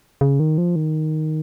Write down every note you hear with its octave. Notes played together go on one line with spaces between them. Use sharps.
C#3
D#3
F3
D#3